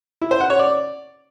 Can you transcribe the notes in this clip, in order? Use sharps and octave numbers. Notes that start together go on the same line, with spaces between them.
E4
C5
F#5
C#5
D5